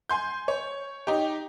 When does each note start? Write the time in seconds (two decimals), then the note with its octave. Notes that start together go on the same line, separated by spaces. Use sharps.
0.09 G#5 C6 G6
0.48 C#5
1.07 D#4 G4